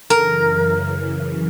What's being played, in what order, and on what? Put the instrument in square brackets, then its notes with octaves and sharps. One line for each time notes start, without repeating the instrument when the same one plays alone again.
[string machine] F#2 C#3 E3 [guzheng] A#4